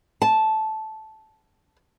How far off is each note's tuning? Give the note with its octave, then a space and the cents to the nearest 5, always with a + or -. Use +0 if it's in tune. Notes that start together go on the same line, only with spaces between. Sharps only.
A5 -10